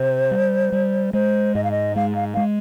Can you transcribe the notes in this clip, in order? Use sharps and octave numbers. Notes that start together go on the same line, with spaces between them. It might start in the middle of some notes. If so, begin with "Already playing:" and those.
Already playing: C3 C5
G3
G3
G#3 C5
G#2 D#5
F5
D#5
G#3 F5
F5
G#3 F5